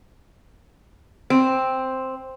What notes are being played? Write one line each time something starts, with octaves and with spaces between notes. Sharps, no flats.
C4